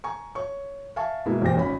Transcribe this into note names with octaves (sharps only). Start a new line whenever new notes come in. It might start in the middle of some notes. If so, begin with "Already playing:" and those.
G#5 A#5 C#6
C#5 C#6
E5 F5 G#5 A5 C#6
B2 G#3 A#3 E4
B1 E2 A#2 G4 C5 A#6
G#1 C#4 B5